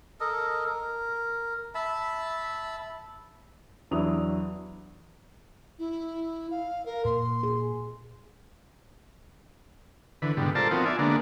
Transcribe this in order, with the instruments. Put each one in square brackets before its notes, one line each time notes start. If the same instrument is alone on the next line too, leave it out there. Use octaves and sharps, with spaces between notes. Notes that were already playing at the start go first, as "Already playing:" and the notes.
[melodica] A4 A#4 D#5
A#4
E5 A5 B5
[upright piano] E2 F#3 D4 E4 D#6 F7
[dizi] E4
F5
A#4
[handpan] A#2 [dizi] C6
[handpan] G#4
[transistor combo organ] D3 E3 B4
G#2 B2 D3 G3
F4 A4 A#4 C5 D5 A5
F3 B3 C4 D#4 F4 F#4
D5 E5 G#5
D3 G#3 A#3 B3 D4